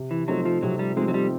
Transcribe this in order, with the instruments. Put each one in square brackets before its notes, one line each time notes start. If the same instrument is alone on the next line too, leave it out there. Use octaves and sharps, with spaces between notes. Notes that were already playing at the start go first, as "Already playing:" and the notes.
Already playing: [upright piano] C3
[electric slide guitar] E3
[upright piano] F3 A3 C4 D#4 [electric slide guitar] F#3
[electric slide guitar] F3
[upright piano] C3 [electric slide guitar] F#3
[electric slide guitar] G3
[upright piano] F3 A3 C4 D#4 [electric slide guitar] G#3
[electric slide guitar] F#3
G3